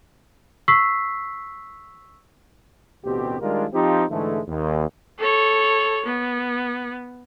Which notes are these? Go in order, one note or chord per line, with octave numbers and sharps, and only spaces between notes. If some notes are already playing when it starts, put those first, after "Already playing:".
C#6 E6 B6 C7
A1 D2 B2 C4 G4
D#3 G3 G#3 D4 F4 A#4
F3 C4 D#4 F4 G4
G#2 D3 E3 G#3 A3
D#2
A4 C#5
B3